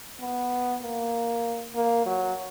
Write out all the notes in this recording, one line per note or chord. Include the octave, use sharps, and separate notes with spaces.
B3
A#3
A#3
F#3